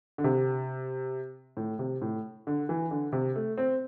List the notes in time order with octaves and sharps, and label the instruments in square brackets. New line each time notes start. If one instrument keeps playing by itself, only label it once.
[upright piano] D3
C3
A2
C3
A2
D3
E3
D3
C3
A3
C4